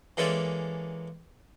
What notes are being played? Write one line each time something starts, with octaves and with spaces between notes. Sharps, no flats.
E3 G#3 A#3 C#4 A4 D5